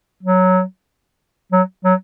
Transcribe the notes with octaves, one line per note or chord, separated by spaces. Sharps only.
F#3
F#3
F#3